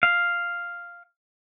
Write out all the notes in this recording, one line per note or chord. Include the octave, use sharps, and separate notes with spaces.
F5